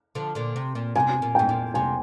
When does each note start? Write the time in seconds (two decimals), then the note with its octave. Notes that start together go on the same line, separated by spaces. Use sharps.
0.15 D3 F3
0.35 A#2 D3
0.56 C3
0.75 A#2
0.95 C3 G#5
1.22 A#2
1.35 G#2 G5
1.49 A#2
1.74 C3 G#5